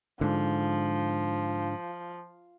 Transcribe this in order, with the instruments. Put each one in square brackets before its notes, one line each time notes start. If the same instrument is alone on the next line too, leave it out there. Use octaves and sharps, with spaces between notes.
[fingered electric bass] G#2 D3 [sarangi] F3